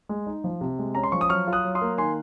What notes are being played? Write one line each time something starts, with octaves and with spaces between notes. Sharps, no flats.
G#3
D#4
F3
C3
G#3
C#4 A#5
C6
F3 C#6
D#6
F#3 C#6 F6
F4
D#6 F#6
F#3
C6 D#6
A#3
D#3 G#5 C6